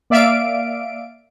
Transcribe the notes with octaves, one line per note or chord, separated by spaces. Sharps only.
A#3 D5 E5 F5 D7